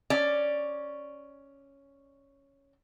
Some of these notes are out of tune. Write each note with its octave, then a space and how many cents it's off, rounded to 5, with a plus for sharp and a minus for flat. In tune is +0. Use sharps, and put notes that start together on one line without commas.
C#4 +0 D5 +0